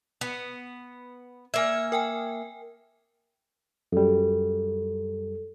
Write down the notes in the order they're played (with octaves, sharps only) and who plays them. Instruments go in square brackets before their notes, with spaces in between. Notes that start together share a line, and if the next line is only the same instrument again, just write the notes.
[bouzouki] B3
[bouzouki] A#3 E5 [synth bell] G#5 F6 G#6
[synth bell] A#4 G5 G#5
[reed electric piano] F#2 G3 [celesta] A4